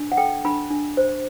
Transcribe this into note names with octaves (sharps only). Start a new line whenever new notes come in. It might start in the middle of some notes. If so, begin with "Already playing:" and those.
Already playing: D4
F#5
A4 G5
D4 B5
D4
C5